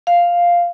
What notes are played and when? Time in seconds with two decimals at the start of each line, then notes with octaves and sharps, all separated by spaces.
0.07 F5